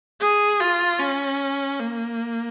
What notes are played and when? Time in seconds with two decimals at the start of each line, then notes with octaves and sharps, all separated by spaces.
0.21 G#4
0.61 F4
1.00 C#4
1.80 A#3